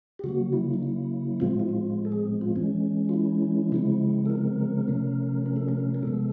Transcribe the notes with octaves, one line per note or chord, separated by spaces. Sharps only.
G4
C#3 F#3 A#3 F#4
E4
D#4
E4
A2 F3 G#3 C4 F4
E4
F4
A4
G#4
F4
E3 G#3 C#4
F4
E4
C#3 F3 G#3 C4
A4
A#4
C3 F3 A3 C#4
A#4
A4
A#4
A#4
C3 F3 G#3 B3 A4